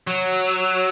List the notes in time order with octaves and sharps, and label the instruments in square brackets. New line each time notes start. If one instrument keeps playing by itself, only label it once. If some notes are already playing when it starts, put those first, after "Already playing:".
[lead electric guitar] F#3